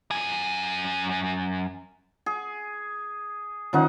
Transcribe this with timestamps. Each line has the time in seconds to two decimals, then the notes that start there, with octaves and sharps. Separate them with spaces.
0.11 F#2 G#5
2.26 G#4
3.73 D#3 F3 C#4 D#4 F#5